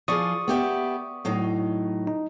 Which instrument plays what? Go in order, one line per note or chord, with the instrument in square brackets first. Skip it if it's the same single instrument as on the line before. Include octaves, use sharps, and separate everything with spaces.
[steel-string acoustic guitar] F3 F4 G#4 [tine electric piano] D5 C#6 D#6
[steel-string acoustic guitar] B3 G4 E5
A2 F#3 D#4
[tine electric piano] D#4